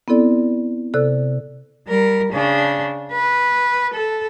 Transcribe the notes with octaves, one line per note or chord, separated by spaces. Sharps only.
B3 C4 E4 A4 D5
C3 A4 D5 F#6
G3 A#4
C#3 D4
B4
A4